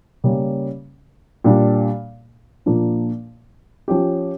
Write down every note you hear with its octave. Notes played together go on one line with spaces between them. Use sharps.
C#3 G3 A#3 C#4
A#2 G3 D4
A#2 F3 A#3 D4
F3 C#4 G4